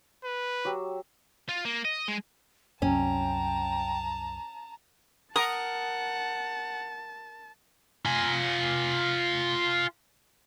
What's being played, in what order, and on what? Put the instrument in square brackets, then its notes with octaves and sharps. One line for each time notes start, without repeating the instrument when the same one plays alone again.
[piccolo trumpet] B4
[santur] F#3 G4 E6
[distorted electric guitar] F4
A#3
D#5
G#3
[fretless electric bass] C2 F#2 [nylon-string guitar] C#4 [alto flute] G5 [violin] A5 A#5
[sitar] A#4 [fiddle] F#5 [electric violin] A5 [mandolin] D#6
[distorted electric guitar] F4 G#5